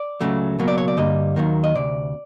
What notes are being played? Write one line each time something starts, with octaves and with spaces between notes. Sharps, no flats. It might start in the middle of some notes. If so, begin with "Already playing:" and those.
Already playing: D5
C#2 C#3 F#3 A3
C#2 B2 F#3 A#3
D5
C#5
D5
G2 D3 G3 A#3 D#5
D#2 D#3 F#3 A#3
D#5
D2 C3 D5